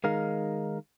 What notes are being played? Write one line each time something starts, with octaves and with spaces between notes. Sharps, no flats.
D#3 G#3 D#4 A#4 F5